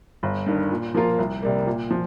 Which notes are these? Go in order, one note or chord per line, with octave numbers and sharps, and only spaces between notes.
G1
G2 D#3
A#2
F3 A#3 F4 A#4
C2
C3 G3 A#3
A#2
F3